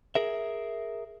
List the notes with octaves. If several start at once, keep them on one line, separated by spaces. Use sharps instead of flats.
G#4 A#4 E5